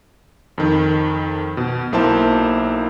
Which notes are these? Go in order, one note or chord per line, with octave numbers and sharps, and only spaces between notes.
F2 D#3
B2
B1 A#3 E4 C5 A5